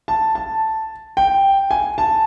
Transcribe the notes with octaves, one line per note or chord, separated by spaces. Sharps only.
A5
A5
G5
G#5
A5